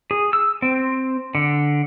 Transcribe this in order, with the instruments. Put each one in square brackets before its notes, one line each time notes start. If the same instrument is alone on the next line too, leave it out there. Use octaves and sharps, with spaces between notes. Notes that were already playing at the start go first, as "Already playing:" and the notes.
[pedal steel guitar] G#4
E6
C4
D3